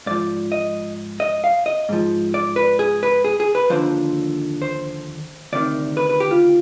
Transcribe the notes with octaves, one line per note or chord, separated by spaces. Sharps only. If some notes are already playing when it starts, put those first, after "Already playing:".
G#2 F3 D5
D#5
D#5
F5
D#5
G#2 F3
D5
B4
G#4
B4
G#4
G#4
B4
D#2 D3 F3 C5
C5
D2 C3 D#3 D5
B4
B4
G4
F4